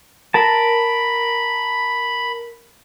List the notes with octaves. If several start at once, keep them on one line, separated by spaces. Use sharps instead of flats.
A#4 A5 B5